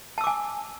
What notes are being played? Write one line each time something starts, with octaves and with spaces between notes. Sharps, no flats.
G#5 A5 D6 E6